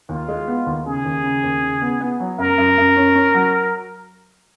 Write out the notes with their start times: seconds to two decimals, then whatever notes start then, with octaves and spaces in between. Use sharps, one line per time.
0.09 D#2 F4
0.29 G#3
0.47 B3
0.66 D#2
0.86 C#3 G#4
1.05 D#2
1.24 C#3
1.43 D#2
1.62 C#3
1.82 B3
2.01 B3
2.20 F#3
2.38 F#2 A#4
2.58 F#2
2.78 F#2
2.96 C#4
3.15 C#4
3.34 F#3